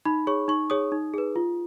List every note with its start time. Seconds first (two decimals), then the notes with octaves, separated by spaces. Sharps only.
0.05 D#4 B5
0.27 G#4 C#5 C#6
0.48 D#4 C#6
0.70 G#4 C#5 D#6
0.92 D#4
1.14 G#4 B4
1.36 F4